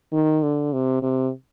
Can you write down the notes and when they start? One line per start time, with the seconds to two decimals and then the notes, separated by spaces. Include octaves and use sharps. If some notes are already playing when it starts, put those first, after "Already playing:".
0.13 D#3
0.43 D3
0.73 C3
1.02 C3